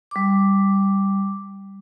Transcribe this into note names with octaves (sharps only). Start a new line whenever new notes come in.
G3 D6